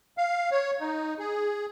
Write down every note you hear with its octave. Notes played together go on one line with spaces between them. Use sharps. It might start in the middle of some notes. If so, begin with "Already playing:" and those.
F5
C#5
D#4
G#4